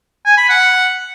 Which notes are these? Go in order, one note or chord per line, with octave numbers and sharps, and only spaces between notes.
G#5
B5
F#5